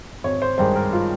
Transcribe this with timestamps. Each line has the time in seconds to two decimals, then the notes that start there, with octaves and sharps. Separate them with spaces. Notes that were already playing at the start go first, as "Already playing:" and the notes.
0.24 G#1 C#5
0.42 C5
0.58 G2 D#3 G#3 C5
0.76 A#4
0.93 F4